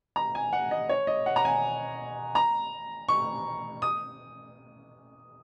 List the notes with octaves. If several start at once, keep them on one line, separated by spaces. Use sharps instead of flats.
A#5
G#5
F#5
D#5
C#5
D#5
F#5
A#5
G#5
A#5
C#6
D#6